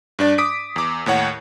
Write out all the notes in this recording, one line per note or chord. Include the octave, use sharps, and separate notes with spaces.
G2 D4 D5
D6 D#6 B6 D7
E2 D6
D#2 A2 C#5 F#5